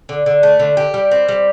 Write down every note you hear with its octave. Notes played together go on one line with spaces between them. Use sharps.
D3
D3
A3
D3
G4
G3
C4
G3